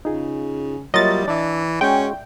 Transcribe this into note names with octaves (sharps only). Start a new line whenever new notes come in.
C#3 D#4 F4 G#4
F#3 G3 A#3 F4 C#5 D#5 E5 A6
E3 D4 D5 E5
G#3 C#4 F#4 G5